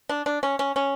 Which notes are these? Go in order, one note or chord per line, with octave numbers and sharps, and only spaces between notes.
D4
D4
C#4
C#4
C#4